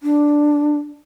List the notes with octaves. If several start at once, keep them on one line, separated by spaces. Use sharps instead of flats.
D4